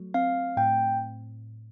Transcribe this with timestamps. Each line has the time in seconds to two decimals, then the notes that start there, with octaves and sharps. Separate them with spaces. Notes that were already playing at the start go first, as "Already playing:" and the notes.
Already playing: F#3 A3
0.14 C4 F5
0.57 A2 G5